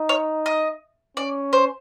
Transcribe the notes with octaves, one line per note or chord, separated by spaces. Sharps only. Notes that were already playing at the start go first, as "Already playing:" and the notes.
Already playing: D#4
C#5
D#5
C#4 D5
C5